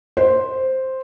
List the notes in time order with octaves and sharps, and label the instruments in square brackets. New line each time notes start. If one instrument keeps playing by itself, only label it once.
[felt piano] C5